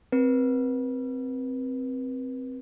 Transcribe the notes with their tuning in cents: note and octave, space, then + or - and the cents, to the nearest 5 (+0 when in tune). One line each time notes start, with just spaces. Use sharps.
C4 +0 B4 -40